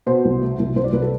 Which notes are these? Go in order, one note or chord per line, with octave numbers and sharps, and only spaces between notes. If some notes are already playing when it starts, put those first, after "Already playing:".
B2 C5
C2
A3
C2
C2 C5
D5
C2 B4
A4